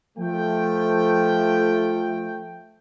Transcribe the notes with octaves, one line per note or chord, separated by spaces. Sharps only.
F3 A3 G5